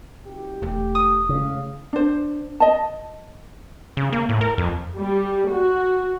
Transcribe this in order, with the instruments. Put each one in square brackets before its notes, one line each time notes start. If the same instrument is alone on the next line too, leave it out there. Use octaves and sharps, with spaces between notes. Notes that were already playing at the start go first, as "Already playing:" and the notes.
[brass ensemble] F#1 G4
[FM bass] E1 [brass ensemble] A3 G4
[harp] D#6
[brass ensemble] A2 G#3 F5 [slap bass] C#3
[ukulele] D4 C5
D#5 A5
[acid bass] C#3
A#3
A2
A#4
F2
[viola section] G3
F#4